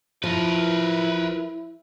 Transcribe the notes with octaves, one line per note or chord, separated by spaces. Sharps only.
F3 E4 A#4 B4